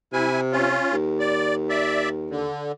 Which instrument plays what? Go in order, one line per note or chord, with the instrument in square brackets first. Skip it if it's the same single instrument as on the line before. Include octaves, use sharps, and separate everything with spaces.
[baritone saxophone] C3 [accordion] E4 G#5
[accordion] C#4 F4
[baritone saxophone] D#2
[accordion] D5
D5 E5
D3